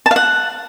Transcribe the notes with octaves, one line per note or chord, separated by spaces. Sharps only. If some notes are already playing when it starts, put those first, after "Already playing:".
A5
F5
F#5